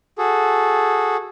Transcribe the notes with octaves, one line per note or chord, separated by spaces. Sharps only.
F#4 G#4 A4